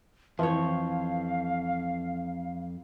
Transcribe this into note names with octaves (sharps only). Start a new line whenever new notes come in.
F2 E3 F3 C#5 F5